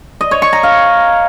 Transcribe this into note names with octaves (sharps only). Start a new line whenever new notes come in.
D#5
C#5
C#6
A#5
F5